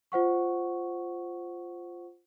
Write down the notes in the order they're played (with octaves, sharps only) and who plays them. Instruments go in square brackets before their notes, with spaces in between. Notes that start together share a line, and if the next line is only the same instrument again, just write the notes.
[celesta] F4 C5 F#5 C#6